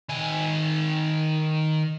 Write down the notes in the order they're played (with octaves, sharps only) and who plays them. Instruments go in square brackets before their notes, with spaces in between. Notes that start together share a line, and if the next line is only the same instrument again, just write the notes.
[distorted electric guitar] D#3 G#5